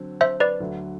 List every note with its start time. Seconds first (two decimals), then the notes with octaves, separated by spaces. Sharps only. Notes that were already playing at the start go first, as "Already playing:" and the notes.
Already playing: D3 F#3 C4
0.21 C5 E5
0.40 B4 D5
0.60 D2 D3 F#3